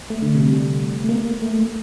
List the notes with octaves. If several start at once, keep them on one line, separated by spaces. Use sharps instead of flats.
A3
D3
C3
G3
A3
A#3
A#3
A3
A3